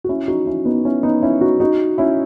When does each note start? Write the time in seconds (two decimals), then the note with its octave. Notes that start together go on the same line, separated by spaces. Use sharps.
0.04 F#4
0.09 C#4 E4
0.28 D#4 F#4
0.46 C#4 E4
0.65 B3 D#4
0.85 C#4 E4
1.03 B3 D#4
1.22 C#4 E4
1.41 D#4 F#4
1.60 D#4 F#4
1.98 C#4 E4